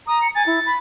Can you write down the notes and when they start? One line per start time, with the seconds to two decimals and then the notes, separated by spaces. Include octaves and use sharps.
0.07 A#5 D#6
0.22 C#7
0.35 G#5 A6
0.46 E4
0.66 B5